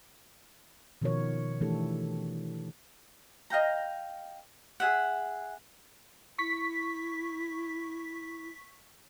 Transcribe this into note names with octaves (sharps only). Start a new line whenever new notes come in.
B2 D#3 F3 F#4 A#4 C#5
E3 A3 D4 E4 G4 A4
D#5 F5 G5 A#5
G#4 E5 F#5
E4 C#6 B6